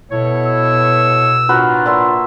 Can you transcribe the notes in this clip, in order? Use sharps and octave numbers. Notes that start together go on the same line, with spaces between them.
B2 E4 A4 C#5
E6
A2 D4 F4 F#4 A#4 B4
A#2 E5 C6